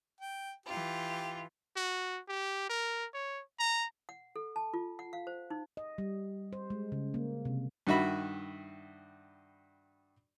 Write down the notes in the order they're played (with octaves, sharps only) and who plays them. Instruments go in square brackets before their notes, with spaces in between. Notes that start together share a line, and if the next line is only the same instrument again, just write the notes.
[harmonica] G5
[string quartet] E3 F4 [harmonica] G4
[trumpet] F#4
G4
A#4
C#5
A#5
[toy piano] F#5
A4
A5
F4
F#5
F5
C5
D#4
[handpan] D#5
G3
C5
G#3
C#3
A#3
C3
[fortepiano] G2 D#3 F#4 E5 B5